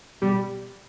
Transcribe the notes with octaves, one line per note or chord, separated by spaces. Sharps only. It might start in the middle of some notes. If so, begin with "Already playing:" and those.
B2 G3 B3